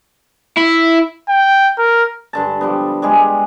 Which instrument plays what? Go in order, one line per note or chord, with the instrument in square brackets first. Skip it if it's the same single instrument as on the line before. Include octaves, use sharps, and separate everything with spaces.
[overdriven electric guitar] E4
[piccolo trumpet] G5
A#4
[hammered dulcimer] G2 D3 A5
F3 G3 B3
G3 G#3 G#4